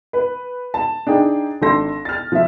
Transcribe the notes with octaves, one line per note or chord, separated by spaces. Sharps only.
B4
A5
D4 D#4 G#4 G5
G#1 D4 A4 C6 A#6
F6 A6
F3 E5